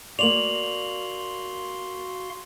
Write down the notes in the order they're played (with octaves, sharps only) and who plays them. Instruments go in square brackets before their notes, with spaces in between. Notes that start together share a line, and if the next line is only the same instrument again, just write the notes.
[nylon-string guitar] A#3 D5 [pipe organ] F#4 F5 C6 [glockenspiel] F7 F#7